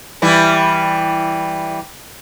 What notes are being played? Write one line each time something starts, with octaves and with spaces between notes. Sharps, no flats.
E3 G3 E4